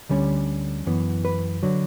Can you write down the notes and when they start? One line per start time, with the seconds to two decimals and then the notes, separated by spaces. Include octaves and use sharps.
0.09 D2 D3 G3 C#4
0.86 F#2 E3 B3
1.25 B4
1.63 D3 F#3